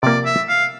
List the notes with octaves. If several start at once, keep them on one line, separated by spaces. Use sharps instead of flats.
C3 F3 A#3 D5
E5
F5